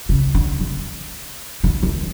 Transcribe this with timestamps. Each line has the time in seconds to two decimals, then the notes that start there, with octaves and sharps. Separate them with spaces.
0.09 C#3
0.35 D3
0.61 D3
1.64 D3
1.83 D#3